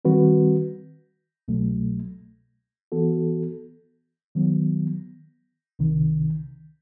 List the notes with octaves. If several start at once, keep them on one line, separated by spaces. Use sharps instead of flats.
D#3 G3 C4 F#4 B4
C2 B2 F#3 A3
E3 B3 F#4 A4
D#3 F#3 B3
C2 C3 D#3